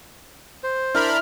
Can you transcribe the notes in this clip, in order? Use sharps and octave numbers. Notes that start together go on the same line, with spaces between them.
C5
D4 E4 A#4 B5 C6 F6